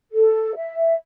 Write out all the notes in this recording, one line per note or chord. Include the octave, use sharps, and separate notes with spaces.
A4
E5